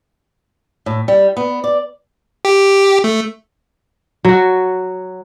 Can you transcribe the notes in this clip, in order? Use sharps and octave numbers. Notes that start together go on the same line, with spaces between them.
A2
G3
B3
D5
G4
A3
F#3 F#4